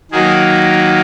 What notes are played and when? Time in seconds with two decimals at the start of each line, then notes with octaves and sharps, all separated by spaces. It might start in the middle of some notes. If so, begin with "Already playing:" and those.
0.11 D#3 F#3 A#3 D#4 G#4